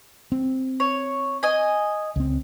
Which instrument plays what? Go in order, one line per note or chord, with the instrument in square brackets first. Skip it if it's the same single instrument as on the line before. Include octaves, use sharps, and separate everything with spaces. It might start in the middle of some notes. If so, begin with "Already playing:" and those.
[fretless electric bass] C4
[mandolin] C#5
D#5 G#5
[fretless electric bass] C#2 C4